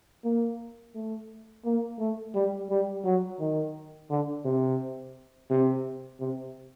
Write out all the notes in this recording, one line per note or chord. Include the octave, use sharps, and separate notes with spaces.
A#3
A3
A#3
A3
G3
G3
F#3
D#3
D3
C3
C3
C3